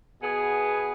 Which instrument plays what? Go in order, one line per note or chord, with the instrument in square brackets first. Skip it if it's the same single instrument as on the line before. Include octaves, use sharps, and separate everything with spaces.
[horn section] B2 B3 G#4